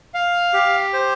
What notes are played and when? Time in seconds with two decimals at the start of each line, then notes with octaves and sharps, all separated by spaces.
0.14 F5
0.53 G4
0.93 C5